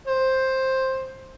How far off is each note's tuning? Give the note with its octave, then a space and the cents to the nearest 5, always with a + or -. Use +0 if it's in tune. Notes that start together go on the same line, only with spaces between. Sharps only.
C5 +10